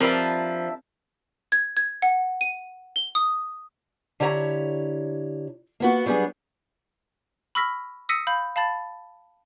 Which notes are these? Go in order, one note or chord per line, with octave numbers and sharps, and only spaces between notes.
F3 G3 C4 D4 A#4 B4 E5
G#6
G#6
F#5
D#7
G7
D#6
D3 E4 G4 C#5 G5 A#5
A#3 B3 F#4
F#3 G3 B3 D4 G#4
B5 C#6 E6 F6 A#6 B6
D#6 E6 A#6 B6 C#7 D#7
F5 B5 G6
F5 A5 B5 A6